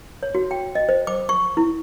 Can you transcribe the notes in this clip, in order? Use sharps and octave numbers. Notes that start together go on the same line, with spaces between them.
C#5
F#4
G5
D#5
C5
D6
C#6
E4